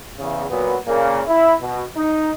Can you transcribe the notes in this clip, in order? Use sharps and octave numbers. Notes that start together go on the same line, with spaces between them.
E2 C#3
A#2 F#3 B3
A#2 C#3 A#3
E4
B2
D#4